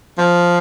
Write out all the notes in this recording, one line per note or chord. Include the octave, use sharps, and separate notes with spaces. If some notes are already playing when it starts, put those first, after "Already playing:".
F3